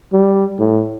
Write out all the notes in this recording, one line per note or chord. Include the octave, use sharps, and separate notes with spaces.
G3
A2